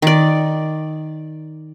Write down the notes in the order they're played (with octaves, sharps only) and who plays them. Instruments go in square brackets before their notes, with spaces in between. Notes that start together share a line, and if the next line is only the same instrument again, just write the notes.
[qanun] D#3 D5